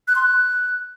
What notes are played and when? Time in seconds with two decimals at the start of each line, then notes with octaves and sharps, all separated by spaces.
0.08 F#6
0.16 C6
0.23 F#6